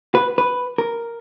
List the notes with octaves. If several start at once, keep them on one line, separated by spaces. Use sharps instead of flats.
B4
B4
A#4